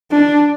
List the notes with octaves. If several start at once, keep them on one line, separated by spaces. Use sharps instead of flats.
D4